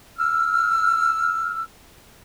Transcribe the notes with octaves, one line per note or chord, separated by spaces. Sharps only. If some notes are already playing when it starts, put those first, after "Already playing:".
E6 F6